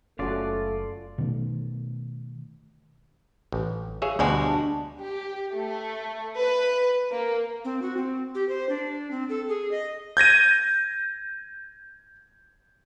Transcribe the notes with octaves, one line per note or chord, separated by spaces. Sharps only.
F#1 A3 C#4 F4 F#4 D5
B2 D#3 A3
A1
G#4 C#5 E5 F5
D2 B2 G3 G#3 D4 F#4
G4
A3
B4
A#3
C4
F#4
C4
G4
C5
D4
C4
A4
G#4
D#5
G6 G#6 A#6 D#7